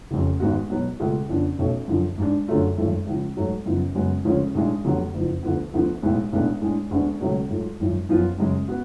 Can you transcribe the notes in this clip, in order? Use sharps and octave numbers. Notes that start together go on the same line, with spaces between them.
F1 F2 C#3
G#1 G#2 G#3 B3 F#4
B2 F#3 B3
C#2 B2 A3 F4 G#4
F2 C#3 F3 B3 D4
B1 B2 A3 C#4
F#2 D3 F3
G#2 G#3 D4
F#2 D3 F#3 A3 F4
G#1 F#2 F3 A3
C#2 C#3 F3
G#2 F#3 A3
F#2 C#3 F3 B3
F#2 C#3 G#3 B3 F#4
D2 C#3 F3 G#3 C#4
B1 A2 G#3 D4
F1 F2 D3 F#3 B3
F#1 F2 F3
D2 D3 F3 B3
D2 D3 F3 B3
B1 A2 G#3 B3
B1 A2 G#3 B3 D4
A2 G#3 D4 G#4
D2 D3 G#3 B3 D4
C#2 B2 F#3 A3 C#4
G#2 F#3 A3 F4
G#1 F#2 F3
F#2 F3 B3 F4
F#2 C#3 G#3
B3 F#4